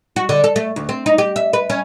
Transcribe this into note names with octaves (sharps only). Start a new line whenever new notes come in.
F#4
D3
A4
A3
D2
C4
D#4
G4
E5
B4
C#4